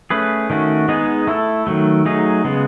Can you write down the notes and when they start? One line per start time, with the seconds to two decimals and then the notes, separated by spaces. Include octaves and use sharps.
0.10 A3 C#4 G#4 B4
0.50 D#3 A3 C#4 F#4
0.88 G#3 B3 D#4 G#4
1.27 A3 E4 A4
1.67 D#3 F#3 A3
2.05 F#3 A3 D#4 G#4
2.44 C#3 G#3 B3